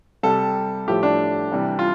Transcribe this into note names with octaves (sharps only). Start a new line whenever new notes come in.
C3 G3 A4
A2 F3 A3 G4
D4
C3 E3 G3
F4